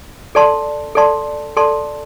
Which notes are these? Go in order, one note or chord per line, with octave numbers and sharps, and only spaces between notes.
A4 D5 A5 C6
A4 D5 A5 C6
A4 D5 A5 C6